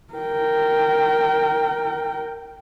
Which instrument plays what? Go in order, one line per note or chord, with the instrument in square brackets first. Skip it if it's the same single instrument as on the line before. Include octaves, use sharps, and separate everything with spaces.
[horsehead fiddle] A#4 G5